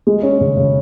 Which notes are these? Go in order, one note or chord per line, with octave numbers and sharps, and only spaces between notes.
G#3
C#4
C#3
C#3